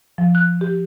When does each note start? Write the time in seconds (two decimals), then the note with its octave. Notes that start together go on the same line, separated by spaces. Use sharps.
0.18 F3
0.35 F#6
0.61 G4